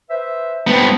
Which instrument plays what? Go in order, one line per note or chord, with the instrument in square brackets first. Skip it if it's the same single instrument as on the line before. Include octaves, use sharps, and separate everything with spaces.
[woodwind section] B4 C5 E5
[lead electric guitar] G2 B3 [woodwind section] C4 F4 C5